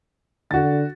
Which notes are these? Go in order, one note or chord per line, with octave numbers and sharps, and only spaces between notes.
D3 F#4 A6